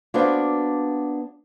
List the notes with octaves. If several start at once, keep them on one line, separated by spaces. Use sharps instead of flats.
A#3 B3 D4 F#4 B4 C5